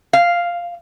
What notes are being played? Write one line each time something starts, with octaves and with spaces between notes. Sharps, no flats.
F5